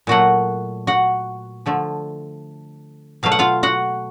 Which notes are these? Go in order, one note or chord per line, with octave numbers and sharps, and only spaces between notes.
A#2 F#3 A3 F#4 F#5
F#4 F#5
D3 F3 A3
B2 F#3 A3 F5
F#5
F4 F5
F#4 F#5